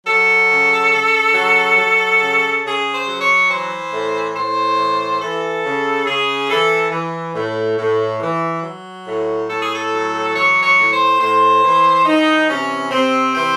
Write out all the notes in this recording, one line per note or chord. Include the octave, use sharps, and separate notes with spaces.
F#3 A4
C#3
C#3
F#3
F#3
C#3
C#3 G#4
C5
F#3
C#5
E3 C5
A2
A2 C5
E3
E3 A4
C#3
C#3 G#4
E3 A4
E3
A2
A2
E3
F#3
A2
A2 A4
G#4
A4
F#3
E3 C#5
C#5
A2
C5
A2 C5
E3
E3 D#4
C3 C#4
C3 C4
E3 C4